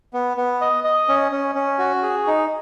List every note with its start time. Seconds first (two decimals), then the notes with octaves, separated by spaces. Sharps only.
0.13 B3
0.37 B3
0.61 D#5
0.84 D#5
1.09 C#4
1.32 C#4
1.55 C#4
1.79 F#4
2.03 G#4
2.27 D#4